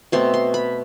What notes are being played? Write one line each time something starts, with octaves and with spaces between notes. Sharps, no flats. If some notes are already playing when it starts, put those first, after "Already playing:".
B2 A3 C4 C6
C6
B5